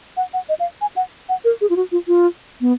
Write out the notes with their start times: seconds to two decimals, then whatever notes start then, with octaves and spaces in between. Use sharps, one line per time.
0.17 F#5
0.34 F#5
0.49 D#5
0.60 F5
0.81 G#5
0.96 F#5
1.29 F#5
1.45 A#4
1.61 G#4
1.70 F4
1.76 F#4
1.92 F4
2.08 F4
2.61 B3